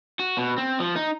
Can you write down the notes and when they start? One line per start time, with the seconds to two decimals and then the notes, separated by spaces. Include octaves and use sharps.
0.19 F#4
0.38 B2
0.58 C4
0.80 F3
0.96 D#4